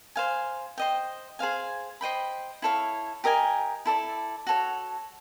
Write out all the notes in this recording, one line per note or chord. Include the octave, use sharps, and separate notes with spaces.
C5 F5 G#5
C5 D#5 G5
G#4 C5 F5 G#5
C5 D#5 G5 B5
E4 A4 C#5 F5
G4 A#4 D#5 G#5
E4 A4 D5
F#4 A4 C#5